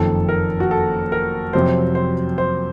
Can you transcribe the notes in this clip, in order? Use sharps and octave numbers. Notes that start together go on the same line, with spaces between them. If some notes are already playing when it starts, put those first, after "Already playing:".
Already playing: F#1 F2 D#3 A4
A#4
F#4
A4
A#4
F2 C3 F#3 C4 C5
C5
C5